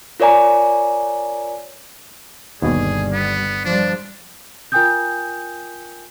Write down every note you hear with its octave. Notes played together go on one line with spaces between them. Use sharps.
F4 A#4 C#5 D5 G#5 A#5
G1 D#2 B2 G3 G#4
B3
F3 G3 D4
F4 A#4 G5 G#5 D#6 G6